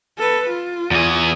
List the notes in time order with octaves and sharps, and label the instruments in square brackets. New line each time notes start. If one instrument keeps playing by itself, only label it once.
[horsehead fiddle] A4 B4
F4
[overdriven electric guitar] E2 G#4